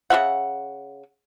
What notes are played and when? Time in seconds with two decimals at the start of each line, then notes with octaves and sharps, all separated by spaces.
0.10 C#3 F#4 E5 F#5